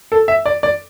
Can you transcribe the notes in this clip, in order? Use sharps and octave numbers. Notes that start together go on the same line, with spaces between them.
A4
E5
D5
D5